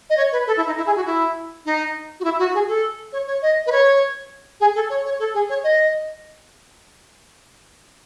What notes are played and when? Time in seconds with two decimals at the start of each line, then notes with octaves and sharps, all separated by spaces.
0.09 D#5
0.17 C#5
0.32 B4
0.47 A4
0.56 E4
0.66 D#4
0.76 E4
0.86 G#4
0.96 F#4
1.05 E4
1.65 D#4
2.20 F#4
2.24 E4
2.38 F#4
2.54 G#4
2.68 A4
3.12 C#5
3.27 C#5
3.42 D#5
3.66 B4
3.72 C#5
4.60 G#4
4.75 A4
4.89 C#5
5.04 C#5
5.19 A4
5.34 G#4
5.49 C#5
5.63 D#5